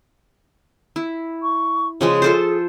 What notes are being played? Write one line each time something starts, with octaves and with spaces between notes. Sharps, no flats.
E4
C#6
C#3 F3 G#3 G#4
F4 A4 C5